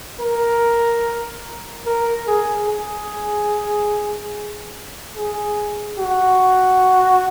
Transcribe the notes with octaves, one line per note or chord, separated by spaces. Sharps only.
A#4
A#4
G#4
G#4
G#4
F#4